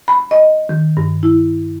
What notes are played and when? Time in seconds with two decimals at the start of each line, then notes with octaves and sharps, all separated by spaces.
0.08 B5
0.31 D#5
0.69 D#3
0.97 G2
1.23 E4